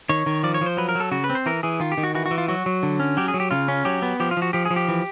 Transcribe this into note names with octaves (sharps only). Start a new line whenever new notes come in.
D#3 C#5
D#3
F3 D5
C#5
F3 C5
F#3 B4
A#4
F#3 A4
C#3 F#4
B4
C4
C5
E3 A#4
E3 G#4
D#3 F4
G4
D#3
F#4
E3 F#4
F#4
E3
F4
F#3 F#4
F#3
D3
C#4
F#3 G4
G#4
F#3
G4
C#3 F4
C#4
F#3 G4
B3
F3 G4
F4
F3
F#4
F3 G4
G#4
F3
G4
E3